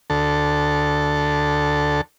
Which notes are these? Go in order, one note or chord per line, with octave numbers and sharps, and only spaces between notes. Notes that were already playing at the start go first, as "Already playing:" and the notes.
D2 A4